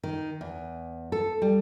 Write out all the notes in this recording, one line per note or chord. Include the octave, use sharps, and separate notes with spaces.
D#3
E2
A4
G3